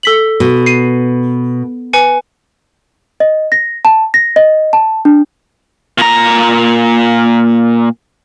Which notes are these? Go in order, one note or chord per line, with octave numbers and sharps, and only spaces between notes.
A4 B6 F#7
B2
C7 D#7
B4 G#5 C#7
D#5
A#6
A5
A#6
D#5
A5
D4
A#2 A#5